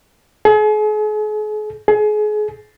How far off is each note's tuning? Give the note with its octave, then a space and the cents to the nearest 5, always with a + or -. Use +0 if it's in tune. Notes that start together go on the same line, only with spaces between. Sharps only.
G#4 +40
G#4 +30